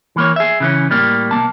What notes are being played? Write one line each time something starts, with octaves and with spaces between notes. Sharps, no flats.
E3 A#3 C#5
G#4 E5
C#3 E3 C#4
A2 G3 A#3
B1 F#3 A#3 A5